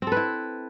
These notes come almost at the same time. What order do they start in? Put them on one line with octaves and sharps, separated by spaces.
C4 A4 B4 E4